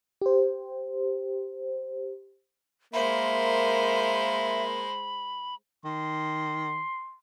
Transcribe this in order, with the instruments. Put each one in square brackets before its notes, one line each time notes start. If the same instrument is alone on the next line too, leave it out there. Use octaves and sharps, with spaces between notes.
[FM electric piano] G4 C5
[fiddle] G#3 C5 [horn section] A#3 A#4 [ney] E5 [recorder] B5
[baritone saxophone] D#3 [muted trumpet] C6